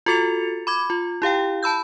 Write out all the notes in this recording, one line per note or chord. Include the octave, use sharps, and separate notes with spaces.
F4 F#4 A4 A6 C#7 F7
B5 D6 G#6
F4
E4 G4 F5 G5
A5 B5 E6 G6